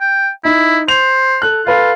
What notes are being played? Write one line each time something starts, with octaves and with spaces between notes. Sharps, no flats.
G5
D#4 E4
C5 F7
A4 F#6
F4 A4 B4 F5